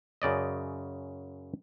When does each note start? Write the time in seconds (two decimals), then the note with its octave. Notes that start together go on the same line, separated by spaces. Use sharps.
0.22 F#2 C#3 D5 D#5